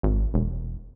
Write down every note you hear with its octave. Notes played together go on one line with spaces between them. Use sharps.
G#1
E1